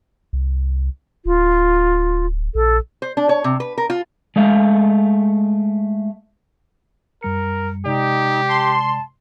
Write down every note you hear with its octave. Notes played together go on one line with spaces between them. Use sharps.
C2
D1 F4
A#1 A4
C5
D4
C#5
C3
B4
A#4
F4
G#3 A3 F5
F#2 G3 A#4 C#7
C3 G#3 D#4 G4 D5
A5 C6